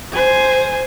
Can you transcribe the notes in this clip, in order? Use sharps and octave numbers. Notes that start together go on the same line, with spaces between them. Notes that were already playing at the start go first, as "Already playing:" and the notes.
C5 G#5